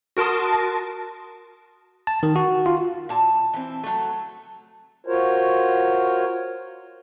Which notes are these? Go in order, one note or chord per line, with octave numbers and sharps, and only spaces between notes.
F#4 A#4 A5 C6 D#6
A5
D#3
F#4
F4
A#2 A5
E3 C4
F#3 A3
F4 F#4 A#4 C5 C#5